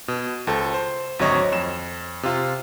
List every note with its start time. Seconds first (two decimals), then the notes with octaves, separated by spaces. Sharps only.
0.08 B2
0.47 C#2 A4 C5
0.74 C5
1.19 G#1 D2 F#3 C4 C#5 D#5
1.52 F2 E7
2.23 C3 F4